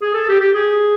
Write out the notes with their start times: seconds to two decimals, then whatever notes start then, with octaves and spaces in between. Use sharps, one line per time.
0.02 G#4
0.14 A4
0.28 G4
0.40 G4
0.54 G#4